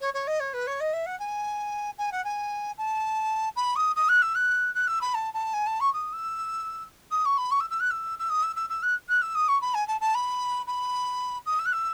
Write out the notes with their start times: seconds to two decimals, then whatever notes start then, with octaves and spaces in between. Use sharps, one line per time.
0.01 C#5
0.14 C#5
0.27 D#5
0.40 C#5
0.54 B4
0.67 C#5
0.80 D#5
0.93 E5
1.06 F#5
1.20 G#5
1.98 G#5
2.12 F#5
2.25 G#5
2.78 A5
3.56 B5
3.76 D#6
3.96 D#6
4.09 F#6
4.22 E6
4.35 F#6
4.75 F#6
4.88 E6
5.01 B5
5.14 A5
5.34 A5
5.54 G#5
5.67 A5
5.80 C#6
5.94 D#6
6.13 E6
7.11 D#6
7.25 C#6
7.38 B5
7.51 C#6
7.60 E6
7.70 E6
7.80 F#6
7.91 E6
8.19 E6
8.30 D#6
8.43 E6
8.56 E6
8.70 E6
8.83 F#6
9.09 F#6
9.22 E6
9.35 D#6
9.48 C#6
9.61 B5
9.74 G#5
9.88 A5
10.01 A5
10.15 B5
10.67 B5
11.46 D#6
11.59 E6
11.66 F#6
11.73 E6